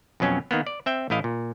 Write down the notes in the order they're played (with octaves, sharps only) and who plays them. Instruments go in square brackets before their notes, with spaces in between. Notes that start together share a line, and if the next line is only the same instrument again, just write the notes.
[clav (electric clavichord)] F2 B2 F#3 C#4
D#3 A#3 B3
D5
C4 E5 G5
A1 A3 E4 D#5 F5
A#2